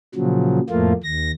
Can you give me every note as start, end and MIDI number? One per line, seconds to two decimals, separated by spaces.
0.15 0.60 46
0.15 0.60 49
0.15 0.60 53
0.15 0.60 54
0.70 0.93 41
0.70 0.93 45
0.70 0.93 53
0.70 0.93 57
0.70 0.93 58
0.70 0.93 65
1.04 1.31 39
1.04 1.31 94